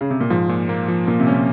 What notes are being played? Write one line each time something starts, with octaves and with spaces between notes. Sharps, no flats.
C#3
C3
A#2
G#2 F3
A#2
A#3
F3
A#2 A#3
C3
C#4
A#2